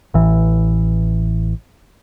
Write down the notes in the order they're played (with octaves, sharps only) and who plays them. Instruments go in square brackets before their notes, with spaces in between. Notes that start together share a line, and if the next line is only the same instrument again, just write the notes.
[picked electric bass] A1 E3